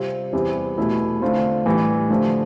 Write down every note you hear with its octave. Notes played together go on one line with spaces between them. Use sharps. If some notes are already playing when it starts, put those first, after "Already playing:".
Already playing: C3 G3 C4 F4
E2 C3 G3 C4 E4
E2 B2 A3 E4
D3 A3 C4 F4
A2 E3 G3
D3 F3 A3